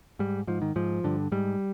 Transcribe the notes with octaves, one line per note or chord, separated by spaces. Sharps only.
G#2 G3
G#2 F3
D#3
G#2 F3
G2 D3
G#2 G3